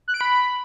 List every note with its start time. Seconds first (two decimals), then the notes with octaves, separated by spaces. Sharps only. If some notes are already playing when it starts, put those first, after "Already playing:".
0.08 F#6
0.14 D7
0.21 B5